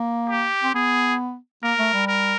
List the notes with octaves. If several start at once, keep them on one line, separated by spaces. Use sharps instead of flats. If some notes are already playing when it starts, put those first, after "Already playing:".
Already playing: A#3
G4
C4
B3 G#4
A#3 A#4
A3
G3
A#4